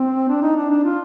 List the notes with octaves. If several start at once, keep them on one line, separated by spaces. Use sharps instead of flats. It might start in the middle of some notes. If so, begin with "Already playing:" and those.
Already playing: C4
D4
D#4
D4
D4
F4